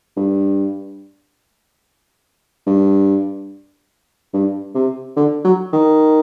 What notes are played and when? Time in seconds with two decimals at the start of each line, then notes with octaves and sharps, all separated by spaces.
0.17 G2
2.67 G2
4.34 G2
4.75 C3
5.16 D3
5.44 F#3
5.73 D#3